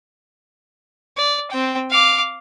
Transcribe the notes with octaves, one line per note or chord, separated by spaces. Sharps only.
D5
C4 G5
F5 D6